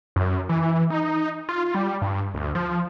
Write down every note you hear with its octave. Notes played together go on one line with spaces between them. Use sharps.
F#2
E3
D#4
F4
G3
G2
D2
F3